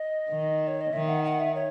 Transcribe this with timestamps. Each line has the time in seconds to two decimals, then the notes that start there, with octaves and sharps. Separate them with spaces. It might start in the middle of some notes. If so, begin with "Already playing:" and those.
Already playing: D#5
0.30 D#3
0.68 C#5
0.81 D#5
0.93 D#3 E5
1.09 F#5
1.25 F#5
1.40 E5
1.55 C#5